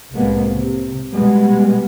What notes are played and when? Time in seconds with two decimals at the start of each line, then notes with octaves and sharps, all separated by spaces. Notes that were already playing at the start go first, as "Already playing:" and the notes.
0.13 C2 A2 G#3 A#3 B3
0.53 C3
1.12 B2 G3 G#3 B3